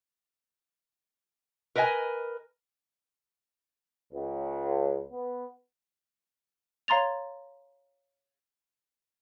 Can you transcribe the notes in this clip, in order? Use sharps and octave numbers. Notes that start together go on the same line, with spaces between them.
A#4 B4 D#5 E5 G#5
C#2
B3
C#5 F5 A#5 C6 A6 F7